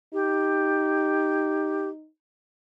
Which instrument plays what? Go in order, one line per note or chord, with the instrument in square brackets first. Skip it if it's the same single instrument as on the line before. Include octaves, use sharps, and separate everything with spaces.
[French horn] D#4 [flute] G4